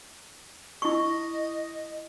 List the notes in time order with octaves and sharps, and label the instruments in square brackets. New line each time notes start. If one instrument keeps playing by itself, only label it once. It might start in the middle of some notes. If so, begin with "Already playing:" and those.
[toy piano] E4 C#6 [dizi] D#5